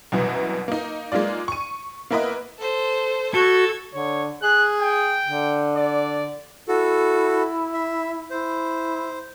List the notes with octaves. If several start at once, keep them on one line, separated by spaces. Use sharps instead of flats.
C2 F#2 B2 E3
A#3 D#4
G#3 A#3 D#4 F4 D5
C#6 D#7
A#3 B3 E4 A#4 B4 D#5
A4 C5
F#4 A4 G#6
D3 C#5
G#4 F#6
G5
D3
D5
E4 F#4 A4
E5
E4 C5